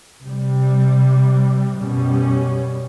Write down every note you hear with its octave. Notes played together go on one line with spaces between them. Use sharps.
C3 G3
F#2 B2 G3 C#4